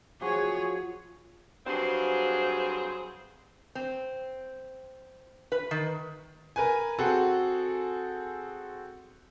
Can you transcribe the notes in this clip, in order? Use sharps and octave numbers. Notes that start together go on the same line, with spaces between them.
F3 F#4 G#4 C#5
G2 F#3 C4 G#4 C5 F5
C4
B4
D#3
A#4 B4 G#5
C4 F#4 G#4 A4